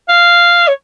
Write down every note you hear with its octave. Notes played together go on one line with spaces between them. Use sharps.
F5
C#5